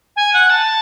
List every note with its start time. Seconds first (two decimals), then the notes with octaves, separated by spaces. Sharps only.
0.16 G#5
0.33 F#5
0.50 A5